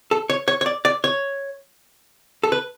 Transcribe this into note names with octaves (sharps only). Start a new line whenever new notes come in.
A4
C#5
C#5
C#5
D5
D5
C#5
A4
B4